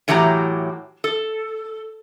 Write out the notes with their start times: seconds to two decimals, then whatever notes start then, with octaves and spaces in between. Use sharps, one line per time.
0.08 A2 E3 F#3 G4 G#5 A#5
1.04 A4